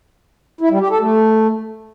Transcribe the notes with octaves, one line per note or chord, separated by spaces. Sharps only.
E4
G3
G4
A4
A3